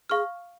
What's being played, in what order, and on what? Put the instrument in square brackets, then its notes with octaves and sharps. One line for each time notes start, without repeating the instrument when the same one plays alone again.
[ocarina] G#4 [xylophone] F5 C#6 F6